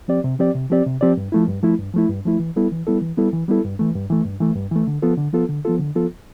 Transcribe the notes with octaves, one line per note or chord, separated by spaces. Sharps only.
F3 C4 G4 D5
C3
F3 C4 G4 D5
C3
F3 C4 G4 D5
C3
F3 C4 G4 D5
G2
F3 A3 E4
G2
F3 A3 E4
G2
F3 A3 E4
G2
F3 A3 E4
E3
G3 B3 E4 A4
E3
G3 B3 E4 A4
E3
G3 B3 E4 A4
E3
G3 B3 E4 A4
G2
E3 A3
G2
E3 A3
G2
E3 A3
G2
E3 A3
D3
F3 B3 F4 A4
D3
F3 B3 F4 A4
D3
F3 B3 F4 A4
D3
F3 B3 F4 A4